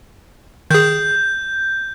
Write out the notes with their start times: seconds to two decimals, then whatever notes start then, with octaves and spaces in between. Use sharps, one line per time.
0.71 D#3 G#4 G6